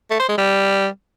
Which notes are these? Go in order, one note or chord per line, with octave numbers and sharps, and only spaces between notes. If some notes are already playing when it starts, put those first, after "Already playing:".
A3
C5
G#3
G3